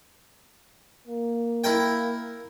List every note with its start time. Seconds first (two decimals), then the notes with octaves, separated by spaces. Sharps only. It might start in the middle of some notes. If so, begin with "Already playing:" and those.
1.07 A#3
1.64 E4 A#4 G5